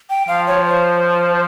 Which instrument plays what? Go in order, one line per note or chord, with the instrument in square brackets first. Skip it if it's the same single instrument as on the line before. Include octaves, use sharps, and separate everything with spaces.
[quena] G5
[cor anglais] F3 [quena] F5
[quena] C#5
C5